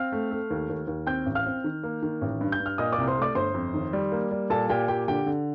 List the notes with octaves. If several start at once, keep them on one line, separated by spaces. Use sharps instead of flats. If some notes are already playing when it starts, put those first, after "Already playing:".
Already playing: C4 F5 F6
A3
A3
D#2
D#2
D#2
C4 G5 G6
A1
F5 F6
C4
D#3
A#3
D#3
A1
G2
G6
G2
F6
A#2 D#5 D#6
D5 D6
C2
C5 C6
A3 D5 D6
G1 C5 C6
F2
D#3
G3
A#3
G3
A#2 A4 A5
A#2 G4 G5
A#2 G4 G5
D3 G4 G5
D3